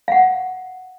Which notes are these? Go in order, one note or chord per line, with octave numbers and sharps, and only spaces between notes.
F5 F#5